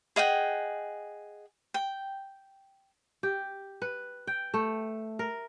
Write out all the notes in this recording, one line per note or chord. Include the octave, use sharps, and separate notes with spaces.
G#4 D#5 F#5 G5
G5
G4
B4
G5
A3
A#4